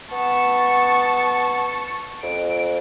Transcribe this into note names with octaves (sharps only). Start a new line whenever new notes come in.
B3 A5 C#6
F2 D7